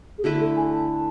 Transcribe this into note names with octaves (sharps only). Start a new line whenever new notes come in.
G#4
D3 A3 E4 F#4 B4
A4
G#5
A5